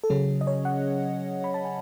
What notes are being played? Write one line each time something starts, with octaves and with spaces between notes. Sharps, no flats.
A4
C#3 F#3 C#4 G#4
D#5
C#5
F#5
B5
A5
G#5